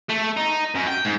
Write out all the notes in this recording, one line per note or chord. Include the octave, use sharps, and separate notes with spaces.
A3
D#4
F#2
G5
G#2